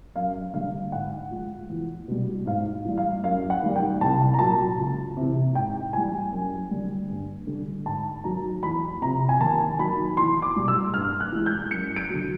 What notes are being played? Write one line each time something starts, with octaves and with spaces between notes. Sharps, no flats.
F#2 F5
D3 G3 F5
G#2 F#5
F3 G#3
E2
B2 G3
G#2 F5
E3 G3
F5
F#2 F5
F#5
D#3 G3
G5
C2 A5
A#5
A#2 F#3 A5
C#2
C3 E3
G#2 G5
E3 G3 G#5
F#2
D3 G3
G2
D3 G3
G#2 A5
D#3 F#3 A#5
E2 B5
C3 F3 A#5
G#5
D#2 A5
D#3 F#3 B5
E2 C6
D6
B2 G3
E6
G2 F6
F#6
E3 G#3
G6
F#2 C#7
D7
D3 F#3